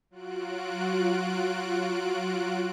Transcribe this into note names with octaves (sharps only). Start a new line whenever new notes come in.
F#3 F4 F#4 F#6 D7